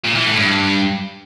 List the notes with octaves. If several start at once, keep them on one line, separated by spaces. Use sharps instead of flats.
A#2
E3
A2
G2